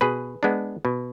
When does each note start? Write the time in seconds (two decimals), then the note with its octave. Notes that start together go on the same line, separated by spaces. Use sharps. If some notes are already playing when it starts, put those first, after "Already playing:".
0.01 B2 G#4 B4
0.43 G#3 B3 D4
0.85 B2